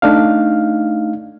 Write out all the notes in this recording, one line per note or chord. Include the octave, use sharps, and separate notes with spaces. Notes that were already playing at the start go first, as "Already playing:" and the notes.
A3 D4 D#4 F5